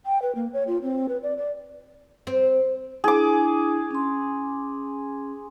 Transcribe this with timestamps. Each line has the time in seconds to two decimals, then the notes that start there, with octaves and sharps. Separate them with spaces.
0.06 G5
0.22 B4
0.35 A#3
0.53 C#5
0.67 F4
0.82 C4
1.09 B4
1.23 D5
1.37 D5
2.27 C4
3.04 D4 E4 G#4 D6
3.91 C#4 C6